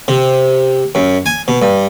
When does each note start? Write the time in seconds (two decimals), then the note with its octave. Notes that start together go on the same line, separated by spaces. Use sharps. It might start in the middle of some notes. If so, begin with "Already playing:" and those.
0.08 C3
0.95 F#2
1.26 G#5
1.48 B2
1.62 G2